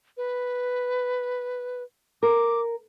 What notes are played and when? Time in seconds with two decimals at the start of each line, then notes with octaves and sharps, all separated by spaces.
0.17 B4
2.23 A#4 D6